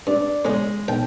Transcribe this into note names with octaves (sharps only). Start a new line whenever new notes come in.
G2 D4
F2 C#3 G#3
B1 G5 A5